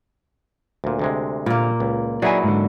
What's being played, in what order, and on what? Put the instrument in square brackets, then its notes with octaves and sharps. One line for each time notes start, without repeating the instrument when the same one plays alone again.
[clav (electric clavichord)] D2 A#2
D2 C3 G#3
[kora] A#2 A#3
[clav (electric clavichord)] C#2
[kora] F#3 E4 [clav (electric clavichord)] D#4 G#4 B4 [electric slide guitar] D5 E5 G#5
[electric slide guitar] G#2 D3